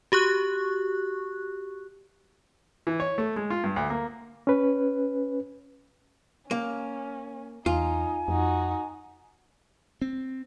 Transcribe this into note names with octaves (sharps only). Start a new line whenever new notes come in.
F#4 G4 C#6 F#6
E3
C#5
A3
G#3
F4
G2
D2
A#3
C#4 B4
A#3 C#4
E2 D#4 F4 G#5
F2 D#4 F#4
C4